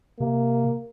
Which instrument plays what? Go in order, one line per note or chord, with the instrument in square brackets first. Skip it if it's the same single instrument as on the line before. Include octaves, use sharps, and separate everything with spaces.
[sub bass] C3 [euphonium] A#3